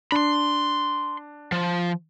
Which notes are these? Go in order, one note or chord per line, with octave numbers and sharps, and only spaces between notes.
D4 B5 C6
F3